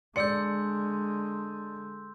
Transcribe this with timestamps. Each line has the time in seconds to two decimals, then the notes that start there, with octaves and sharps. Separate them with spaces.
0.16 D3 G#3 D5 C6 E6 G6 C#7